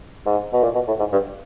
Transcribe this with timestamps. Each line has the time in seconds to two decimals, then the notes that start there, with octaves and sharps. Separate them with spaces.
0.26 G#2
0.53 B2
0.63 A#2
0.75 B2
0.87 A2
0.99 G#2
1.12 G2